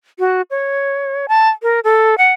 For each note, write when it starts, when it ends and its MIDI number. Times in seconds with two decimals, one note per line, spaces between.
0.19 0.42 66
0.51 1.26 73
1.28 1.49 81
1.63 1.80 70
1.84 2.18 69
2.18 2.33 78